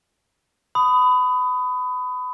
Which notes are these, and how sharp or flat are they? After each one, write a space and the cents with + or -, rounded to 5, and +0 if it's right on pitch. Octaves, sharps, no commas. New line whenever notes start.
B5 +25 D#6 +0